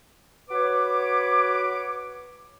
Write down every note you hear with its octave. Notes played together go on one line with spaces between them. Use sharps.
F#4 B4 C#5 D6